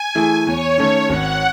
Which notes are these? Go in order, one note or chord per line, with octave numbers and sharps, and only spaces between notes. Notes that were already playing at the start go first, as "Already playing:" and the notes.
Already playing: G#5
E3 A3 E4 G#4
E2 C#5
D#3 A3 C#4
G#1 F#5